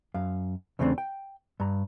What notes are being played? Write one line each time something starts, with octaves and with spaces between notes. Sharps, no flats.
F#2 F5
E2 C#3 A3 A#3 C4 D4
G5
G2 A#5